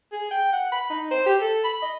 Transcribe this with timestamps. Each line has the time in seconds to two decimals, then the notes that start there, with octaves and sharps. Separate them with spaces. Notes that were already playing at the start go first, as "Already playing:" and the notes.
0.12 G#4
0.31 G5
0.53 F#5
0.72 B5
0.90 D#4
1.11 C5
1.26 G4
1.41 A4
1.64 B5
1.82 D#5